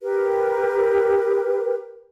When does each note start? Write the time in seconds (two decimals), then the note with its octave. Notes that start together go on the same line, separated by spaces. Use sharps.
0.01 G4 A#4 B4